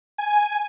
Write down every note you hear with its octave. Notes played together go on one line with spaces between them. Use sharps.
G#5